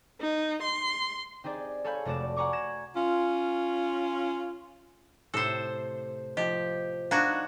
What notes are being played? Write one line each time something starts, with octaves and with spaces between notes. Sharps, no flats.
D#4
C6
C4 D#4 G4 G#4 D5
A4 C#5 F5 G#5 B5 G6
F1 A3 F#4 D5 E7
F#5 G#5 A#5 C#6 D6
F#6 G#6 A#6 E7
C#4 F4
A2 C3 A4 C5
F3 G4 D#5
B3 D4 D#4 F#4 F5 A#5 G#6